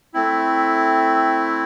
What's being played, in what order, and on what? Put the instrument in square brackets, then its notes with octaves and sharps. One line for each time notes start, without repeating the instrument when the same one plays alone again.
[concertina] A3 C4 E4